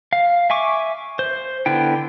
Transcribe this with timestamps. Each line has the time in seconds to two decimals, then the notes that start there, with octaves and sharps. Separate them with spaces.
0.13 F5
0.50 E5 G#5 C#6 D6
1.19 C5
1.66 D3 B3 E4 G5